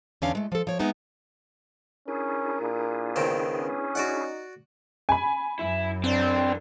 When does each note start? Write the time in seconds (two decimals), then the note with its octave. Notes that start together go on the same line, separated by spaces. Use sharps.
0.22 E2 D3 C#4 D4 F5
0.35 G#3 A3
0.52 F3 A4
0.67 F3 C#5
0.79 G#3 B3 D#4 E5
2.08 C#4 D4 E4 G#4 A#4
2.61 A#2
3.16 C#2 D#3 B3 C4
3.60 C#4
3.95 D#4 F#4 D5 F#5
5.09 G#5 B5
5.59 F#2 E4
6.04 E3 C4 D4